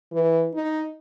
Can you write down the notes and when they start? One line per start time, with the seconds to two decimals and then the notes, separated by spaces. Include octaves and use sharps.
0.12 E3
0.54 D#4